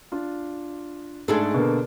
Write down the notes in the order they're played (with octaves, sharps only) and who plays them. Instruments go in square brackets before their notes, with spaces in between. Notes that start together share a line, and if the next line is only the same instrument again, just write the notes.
[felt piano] D4 F4
[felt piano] G#2 G#3 A3 [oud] D4 G#4 A4
[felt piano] B2 D3 A#3